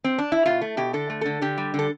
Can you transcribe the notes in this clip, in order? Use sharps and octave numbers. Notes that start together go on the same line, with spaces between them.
C4
D4
E4
B2 F4
A3
B2 G4
D3 A4
A3
D3 A4
D3 G4
G3
D3 A4